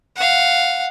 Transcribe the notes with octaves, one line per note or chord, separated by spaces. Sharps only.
F5 F#5